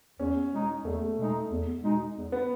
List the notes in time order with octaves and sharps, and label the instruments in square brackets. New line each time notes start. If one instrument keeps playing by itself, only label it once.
[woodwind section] E2 [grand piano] C#4
[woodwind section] B2 G#3 D#4
[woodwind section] E2 [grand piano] A3
[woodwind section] B2 G#3 D#4
E2
B2 G#3 D#4
E2
[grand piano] B3